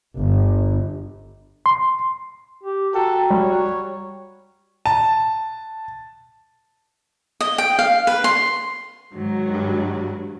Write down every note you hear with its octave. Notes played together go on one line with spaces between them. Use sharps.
G1
C6
G4
F#4 A4 G5 A#5
G3 C#5
A5
D#5
G5
F5
B4
C6
G#2 D#3 F#3 G#3 F#4
G2